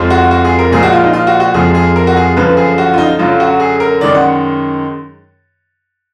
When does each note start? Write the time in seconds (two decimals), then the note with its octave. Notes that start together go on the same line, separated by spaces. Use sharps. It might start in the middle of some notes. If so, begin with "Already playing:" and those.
Already playing: F2 F3 G#3
0.10 F#4
0.31 F#4
0.45 G#4
0.59 A#4
0.72 A#2 F3 G#3 G#4
0.83 F#4
0.93 F4
1.04 D#4
1.13 F4
1.27 F#4
1.40 F#4
1.54 F2 F3 G#3 G#4
1.75 G#4
1.96 A#4
2.07 F#4
2.16 G#4
2.37 F#2 D3 F3 B4
2.57 G#4
2.78 F#4
2.94 F4
2.98 D#4
3.19 F#2 D3 F#3 F4
3.40 F#4
3.60 G#4
3.80 A#4
4.01 F#2 D#3 G#3 D5
4.15 F#5